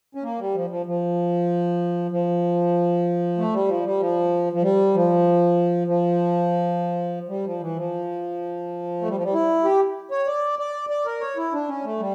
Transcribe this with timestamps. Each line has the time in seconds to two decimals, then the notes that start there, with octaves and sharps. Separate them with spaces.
0.15 C#4
0.23 A#3
0.39 G3
0.55 F3
0.70 F3
0.86 F3
2.11 F3
3.38 A3
3.53 G3
3.68 F3
3.85 G3
4.00 F3
4.53 F3
4.62 G3
4.94 F3
5.87 F3
7.29 G3
7.45 F3
7.61 E3
7.76 F3
9.02 A3
9.09 G3
9.16 F3
9.23 G3
9.33 E4
9.64 G4
10.11 C#5
10.27 D5
10.59 D5
10.90 D5
11.06 A#4
11.21 C#5
11.37 E4
11.53 D4
11.68 C#4
11.84 A3
11.99 G3